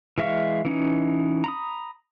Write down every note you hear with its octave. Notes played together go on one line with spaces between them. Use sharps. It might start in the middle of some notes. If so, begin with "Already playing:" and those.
E3 G#3 E5 F5 C#6
E3 C#4 D#4
A#5 B5 D#6